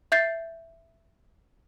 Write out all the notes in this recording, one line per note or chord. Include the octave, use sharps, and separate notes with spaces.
E5 G6 A6 C7